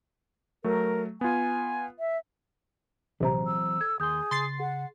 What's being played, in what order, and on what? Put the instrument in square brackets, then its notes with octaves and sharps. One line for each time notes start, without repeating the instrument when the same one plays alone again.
[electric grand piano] F#3 A3 [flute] A#4
[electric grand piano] B3 F4 [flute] G#5
[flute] E5
[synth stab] A#1 C3 [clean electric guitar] E3 F#3 C4 [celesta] G#4 C5 A#5
[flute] E6
[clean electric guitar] A4 [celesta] G#6
[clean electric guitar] D#2 C6 [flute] G#4 [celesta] D#6 G6
[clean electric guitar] C#3 [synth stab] C6 A6 C7
[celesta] G#4 [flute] F#5